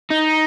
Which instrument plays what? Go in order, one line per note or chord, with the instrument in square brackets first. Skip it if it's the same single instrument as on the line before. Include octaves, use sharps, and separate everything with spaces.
[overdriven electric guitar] D#4